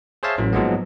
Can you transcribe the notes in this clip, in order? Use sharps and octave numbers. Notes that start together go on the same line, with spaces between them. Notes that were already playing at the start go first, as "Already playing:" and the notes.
G#4 C5 C#5 E5 F5 A5
A1 E3 F#3
G#2 F3 F#3 G#3 A#3 B3